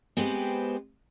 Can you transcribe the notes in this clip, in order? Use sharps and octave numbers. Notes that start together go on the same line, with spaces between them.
G#3 B3 C4 G4 B4 C5